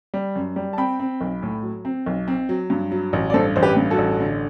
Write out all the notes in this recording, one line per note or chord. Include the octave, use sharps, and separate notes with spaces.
G3
F#2
G3
A5
C4 G5 B5
C4
B1
A2
F#3
C4
B1
C4
F#3
G2
F#3
A1
D5
G2 A4 C5
A1 C5
G4 B4
G2
F#4 A4
A1
D3